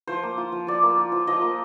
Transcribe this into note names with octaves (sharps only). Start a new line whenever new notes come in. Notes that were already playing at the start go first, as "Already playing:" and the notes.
F3 C5
A#3
F4
F3
F3 D5
A#3
F4
F3
F3 D#5
A#3